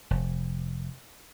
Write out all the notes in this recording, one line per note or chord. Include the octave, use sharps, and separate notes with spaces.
F1